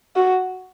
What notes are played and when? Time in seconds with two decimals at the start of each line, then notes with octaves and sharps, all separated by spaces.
0.16 F#4